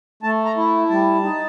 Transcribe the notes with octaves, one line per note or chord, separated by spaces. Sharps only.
A3 A5
A#5
E4
G3 A5
D#4